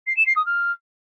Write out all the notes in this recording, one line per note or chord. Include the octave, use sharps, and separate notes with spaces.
C7
E7
C7
D#6
F6